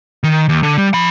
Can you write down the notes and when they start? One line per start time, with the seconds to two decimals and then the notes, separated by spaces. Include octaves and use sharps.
0.24 D#3
0.49 D#2
0.63 D3
0.78 G3
0.94 F3 B5